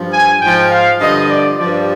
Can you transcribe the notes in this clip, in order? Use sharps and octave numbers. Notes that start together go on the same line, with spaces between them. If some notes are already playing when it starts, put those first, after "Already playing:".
Already playing: G2 F3
G#5
G#2 F3 G5
F5
G2 D3 F3 D#5
D5
G2 F3 D5